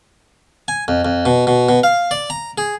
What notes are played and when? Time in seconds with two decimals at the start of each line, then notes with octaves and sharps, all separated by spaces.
0.68 G#5
0.88 F2
1.05 F2
1.26 B2
1.47 B2
1.69 B2
1.84 F5
2.11 D5
2.30 A#5
2.58 G#4